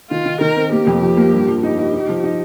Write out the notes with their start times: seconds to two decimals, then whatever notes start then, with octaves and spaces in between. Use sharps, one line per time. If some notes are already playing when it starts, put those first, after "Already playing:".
0.10 D#3 F4
0.26 D#3
0.41 D#3 A#4
0.56 C4
0.72 A#3 G4
0.87 F2
1.02 F3
1.17 A#3
1.33 G2
1.48 F3
1.63 D#4 G4
1.78 D#4
1.94 D#4
2.09 F3
2.24 D#4